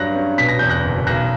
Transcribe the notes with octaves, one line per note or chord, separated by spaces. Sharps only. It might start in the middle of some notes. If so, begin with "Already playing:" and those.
Already playing: G2 F#3 F#6 A#6
C#4
B2 B6
A#6
E2 G6
F#6 A#6
F#1
B1 F#6 A#6